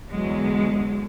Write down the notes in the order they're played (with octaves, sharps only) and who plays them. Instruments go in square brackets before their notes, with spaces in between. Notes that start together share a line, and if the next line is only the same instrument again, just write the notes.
[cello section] E2 D3 F#3 G#3